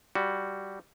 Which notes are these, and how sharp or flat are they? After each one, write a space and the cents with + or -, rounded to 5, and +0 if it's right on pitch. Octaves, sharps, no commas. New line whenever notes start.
G3 -5 F#4 +0